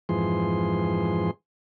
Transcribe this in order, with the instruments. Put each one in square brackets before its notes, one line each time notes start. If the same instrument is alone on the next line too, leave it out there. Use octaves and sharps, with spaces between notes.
[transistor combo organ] F2 G#2 E3 F3 G#4 C6